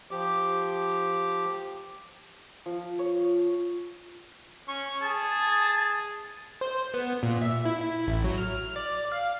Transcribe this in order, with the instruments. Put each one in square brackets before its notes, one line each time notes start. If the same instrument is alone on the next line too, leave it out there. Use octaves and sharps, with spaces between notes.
[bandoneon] F3 G4 D6
[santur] F3
C#5
[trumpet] C#4 [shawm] C#6
[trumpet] G#4 [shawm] A5
[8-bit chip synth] C5
B3
A#2
E5
E4
E4
A1
F#3
F6
D5
F5